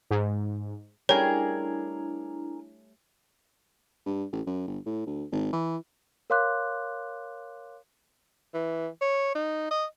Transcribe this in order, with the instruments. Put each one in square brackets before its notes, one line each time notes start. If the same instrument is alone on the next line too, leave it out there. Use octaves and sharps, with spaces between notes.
[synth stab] G#2
[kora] G3 A3 C#4 [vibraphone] D4 E4 [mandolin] G#4 A#4 [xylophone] C#5
[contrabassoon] G2
A1
F#2
G1
A2
D2
G#1
E3
[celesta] A#4 C#5 F5 C6 D6 F#6
[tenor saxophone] E3
C#5
D#4
D#5